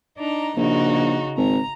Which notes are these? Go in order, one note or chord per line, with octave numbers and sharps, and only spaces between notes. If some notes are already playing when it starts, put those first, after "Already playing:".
D4 D#4 A#5
A#1 C#3 D#4 F#4
G#1 A#5